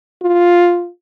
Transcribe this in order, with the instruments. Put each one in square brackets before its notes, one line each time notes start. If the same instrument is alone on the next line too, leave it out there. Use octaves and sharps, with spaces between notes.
[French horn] F4